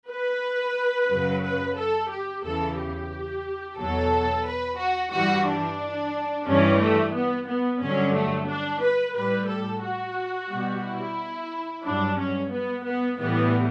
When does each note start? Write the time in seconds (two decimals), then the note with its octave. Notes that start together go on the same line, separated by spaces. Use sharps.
0.09 B4
1.09 F#2 C#3 F#3
1.43 B4
1.77 A4
2.10 G4
2.44 E2 C#3 E3 A4
2.78 G4
3.78 E2 B2 F#3 A4
4.45 B4
4.79 F#4
5.12 G2 E3 G3 F#4
5.47 D4
6.47 G2 E3 G3 C#4
6.81 A3
7.14 B3
7.48 B3
7.82 G2 D3 F#3 C#4
8.15 A3
8.49 D4
8.82 B4
9.16 A2 G3 B4
9.49 A4
9.84 F#4
10.50 B2 G3
10.84 E4
11.84 G2 F#3 D4
12.19 C#4
12.52 B3
12.86 B3
13.19 A2 E3 G3 B3